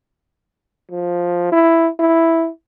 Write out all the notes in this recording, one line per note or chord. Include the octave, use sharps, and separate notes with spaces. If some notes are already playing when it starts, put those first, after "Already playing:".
F3
E4
E4